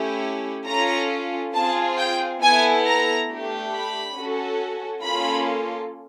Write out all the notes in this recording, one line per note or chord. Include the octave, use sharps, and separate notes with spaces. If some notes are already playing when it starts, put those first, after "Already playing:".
Already playing: A3 C#4 E4 G4
C#4 F4 A4 A#5
C4 F4 G#4 A5
G5
B3 E4 A4 G#5
A#5
A3 D4 G4
B5
C#4 F#4 A4
A#3 C#4 F4 A4 B5